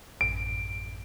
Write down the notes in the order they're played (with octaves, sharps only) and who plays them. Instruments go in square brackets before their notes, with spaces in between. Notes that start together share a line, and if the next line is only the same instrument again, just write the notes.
[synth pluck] A1 F#2 [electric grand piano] D7